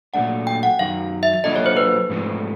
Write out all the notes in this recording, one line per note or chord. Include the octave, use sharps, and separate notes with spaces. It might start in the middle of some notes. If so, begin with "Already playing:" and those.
A#2 F#3 A3 D4 F#5
G5
F#5
F#2 D#3 F#3 F5
E5
E5
F#3 A#3 D4 F4 A4 D#5
C#5
C5
B4
G#2 F3 A3 C4